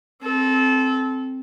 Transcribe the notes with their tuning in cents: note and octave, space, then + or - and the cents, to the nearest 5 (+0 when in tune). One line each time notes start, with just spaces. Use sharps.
C4 +0 A4 -25